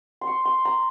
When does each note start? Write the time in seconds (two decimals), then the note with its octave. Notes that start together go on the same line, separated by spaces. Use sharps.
0.21 C6
0.27 C#6
0.45 C6
0.65 A#5